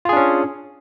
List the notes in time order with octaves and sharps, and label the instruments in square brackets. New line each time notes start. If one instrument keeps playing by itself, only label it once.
[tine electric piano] F4
G#4
D4
C#4